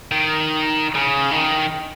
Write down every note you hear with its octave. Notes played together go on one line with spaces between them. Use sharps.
D#3
C#3
D#3